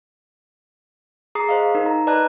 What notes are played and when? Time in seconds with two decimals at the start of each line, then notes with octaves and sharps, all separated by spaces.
1.35 G#4 A#5 D#6 C7
1.49 C5 D#5 F5
1.75 D#4 A#4
1.86 A#5
2.07 B4 D5 D#5 A5 A#5 F#6